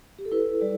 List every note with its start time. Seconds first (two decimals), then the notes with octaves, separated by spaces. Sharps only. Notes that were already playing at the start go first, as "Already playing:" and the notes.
0.19 G4
0.25 A4
0.32 E4 B4
0.61 G3 D5